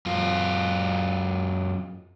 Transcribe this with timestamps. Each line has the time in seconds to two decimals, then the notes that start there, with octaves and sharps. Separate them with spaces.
0.06 F#2 F4